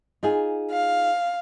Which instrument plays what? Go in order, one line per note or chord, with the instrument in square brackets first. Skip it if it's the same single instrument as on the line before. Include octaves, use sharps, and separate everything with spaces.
[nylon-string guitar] D#4 F4 G#4
[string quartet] F5